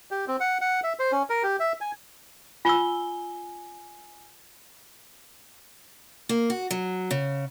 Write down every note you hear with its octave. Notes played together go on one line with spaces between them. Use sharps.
G4
C4
F#5
F#5
E5
C5
C#4
A#4
G4
E5
G#5
F4 G#5 E6 G7
A#3
F#4
F#3
C#3